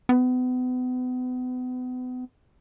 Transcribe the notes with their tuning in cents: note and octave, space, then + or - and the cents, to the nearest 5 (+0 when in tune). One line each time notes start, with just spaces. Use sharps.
B3 +35